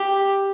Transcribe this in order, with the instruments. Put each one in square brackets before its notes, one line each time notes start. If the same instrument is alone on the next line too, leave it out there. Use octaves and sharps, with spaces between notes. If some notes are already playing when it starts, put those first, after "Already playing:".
Already playing: [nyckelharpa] G4